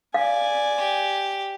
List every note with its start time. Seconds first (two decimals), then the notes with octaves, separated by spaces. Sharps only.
0.14 D5 F5 G#5
0.78 G4